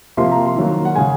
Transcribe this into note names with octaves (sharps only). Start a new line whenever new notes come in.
C3 F3 A#3 C6
A#5
C6
D#3 F#3 A#3
F#5
C#3 G#3 G#5